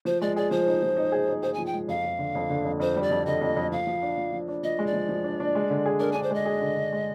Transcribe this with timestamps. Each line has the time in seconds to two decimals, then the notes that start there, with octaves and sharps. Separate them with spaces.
0.05 F3 C5
0.21 G#3 D5
0.36 G#4 D5
0.51 F3 C5
0.67 D#4
0.82 F3
0.97 D#4
1.12 G#4
1.28 D#4
1.42 G#4 C5
1.54 F3 G#5
1.66 G5
1.74 G#3
1.88 F2 F5
2.04 F2
2.19 D3
2.35 F2
2.50 D3
2.65 F2
2.80 F2 C5
2.96 G3
3.03 D5
3.10 F2
3.26 D3 D#5
3.41 F2
3.57 F2
3.72 F3 F5
3.87 F3
4.03 D4
4.17 F3
4.32 F3
4.48 D4
4.63 F3 D#5
4.79 G#3
4.87 D5
4.93 F3
5.09 F3
5.24 D4
5.40 D4
5.55 G#3
5.70 D3
5.86 G#4
6.00 D4 A#4
6.12 D4 G#5
6.23 C5
6.31 G#3 D#5
6.46 G#4
6.62 D3
6.76 D3
6.92 G#3